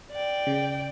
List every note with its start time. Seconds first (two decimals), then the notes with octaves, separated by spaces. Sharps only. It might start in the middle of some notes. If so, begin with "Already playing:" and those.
0.12 D5 G5
0.47 C#3